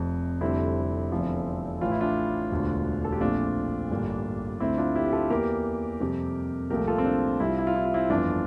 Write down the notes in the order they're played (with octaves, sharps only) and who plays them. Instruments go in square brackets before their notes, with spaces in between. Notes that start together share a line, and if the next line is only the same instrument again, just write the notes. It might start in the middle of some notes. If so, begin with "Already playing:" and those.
Already playing: [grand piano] F1 F2 C3
F1 F2 D3 G3 C4 E4
F1 E2 D3 F3 C4
A1 A2 E3 F4
E4
D4 F4
E1 D2 D3
A4
G4
A#1 A#2 A3 C4 D4 F4
A1 G2 D3 G3 A#3
D2 D3 A3 C4 E4
D4 F4
E4 G4
G4
F4 A4
E2 E3 A#3 G4 A#4
F2 C3 G3
C2 A#2 F3 A3 G4 A#4
F4 A4
C4
D4
C2 C3 G3 C4 E4
F4
E4
F4
E4
F4
C4 E4
G1 F2 E3 D4 F4